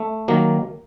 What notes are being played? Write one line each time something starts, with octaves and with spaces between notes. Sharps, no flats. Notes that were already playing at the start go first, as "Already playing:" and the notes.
Already playing: A3
D#3 F#3 A#3